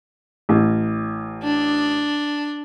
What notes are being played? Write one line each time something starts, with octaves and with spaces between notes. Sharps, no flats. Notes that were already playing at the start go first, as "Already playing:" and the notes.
A1
D4